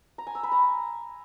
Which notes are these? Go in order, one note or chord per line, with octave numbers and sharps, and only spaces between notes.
A#5
G#5
E6
B5
A#5